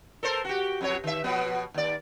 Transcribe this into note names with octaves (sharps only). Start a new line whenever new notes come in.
A4 A#4 C5
F#4 G4
F2 F#3 C#5
D#3 E5
B2 F3 B3
D#2 D5